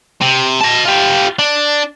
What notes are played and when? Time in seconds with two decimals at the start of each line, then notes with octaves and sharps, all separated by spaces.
0.21 C3
0.61 D#5 A5
0.86 F4 G4
1.39 D4